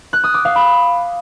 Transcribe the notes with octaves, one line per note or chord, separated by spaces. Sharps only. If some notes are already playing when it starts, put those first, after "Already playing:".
F#6
D#6
D6
F5
B5